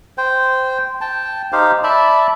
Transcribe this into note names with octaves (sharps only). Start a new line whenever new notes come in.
C5 G5
G5 A5
D#4 G4 C5 F5
D5 E5 A5 B5